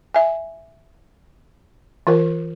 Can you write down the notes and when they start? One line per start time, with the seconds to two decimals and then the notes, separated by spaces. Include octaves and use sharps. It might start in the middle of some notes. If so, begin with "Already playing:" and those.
0.15 E5 G#5
2.07 E3 F4 A#4